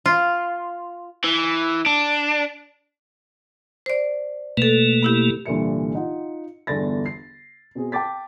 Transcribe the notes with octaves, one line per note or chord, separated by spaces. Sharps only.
F4
E3
D4
C5 D5
B2 A3 A#3 A4 B4
B3 E4 G4
C2 A#2 D3 E3 E5 C#7
D#4 F4 F#5
G1 E2 D3 D4 A6 A#6
C7
B2 C4 G#4
G5 A5 D6 A6 B6